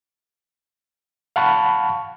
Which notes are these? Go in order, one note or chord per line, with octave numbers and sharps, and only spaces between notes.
F5 F#5 A5 B5 C#6